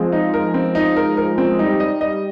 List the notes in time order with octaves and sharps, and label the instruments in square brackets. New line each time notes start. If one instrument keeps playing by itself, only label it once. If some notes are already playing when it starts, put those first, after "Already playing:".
Already playing: [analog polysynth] F3 G#3 [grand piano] C4
[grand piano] D#4
A#4
C4
D#4
A#4
A#4
C4
[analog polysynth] G#3
[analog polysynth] G3 [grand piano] D#4
[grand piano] D#5
D#5